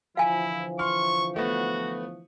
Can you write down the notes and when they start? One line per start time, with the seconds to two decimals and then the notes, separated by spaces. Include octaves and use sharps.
0.17 D3 E3 F3 E4 F5 G#5
0.79 C6 C#6 F6
1.36 A3 B3 F#4